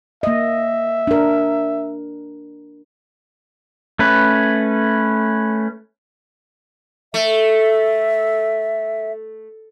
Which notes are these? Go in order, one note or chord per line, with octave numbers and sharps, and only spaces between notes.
A#3 D#5 E5
D4 A#4
A3 C#4 B4
A3 E5